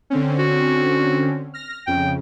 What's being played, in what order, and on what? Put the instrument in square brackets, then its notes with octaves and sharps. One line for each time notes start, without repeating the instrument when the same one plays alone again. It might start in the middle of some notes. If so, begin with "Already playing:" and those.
[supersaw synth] D3 C4 C#4
[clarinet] F#4
[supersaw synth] F6 A#6
[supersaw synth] F2 C#3 [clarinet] G5